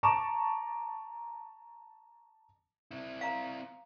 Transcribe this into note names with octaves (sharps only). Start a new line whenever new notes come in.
A5 A#5 C#6 D6 E7
C4 E4
F5 A#5